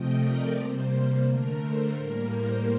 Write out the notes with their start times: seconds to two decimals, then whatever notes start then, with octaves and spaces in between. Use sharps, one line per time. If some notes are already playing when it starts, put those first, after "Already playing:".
Already playing: C3 F3 A3 D#5 G5
0.18 A#4 D5
0.53 C3 G3 A#3 C5
0.90 C5
1.24 D3 A3 A#4
1.60 C5
1.95 A2 G3 A#3 A#4
2.31 C5